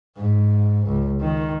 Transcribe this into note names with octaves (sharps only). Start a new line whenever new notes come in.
G#2
C#2
D#3